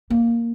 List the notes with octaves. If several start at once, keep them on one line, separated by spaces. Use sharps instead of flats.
A#3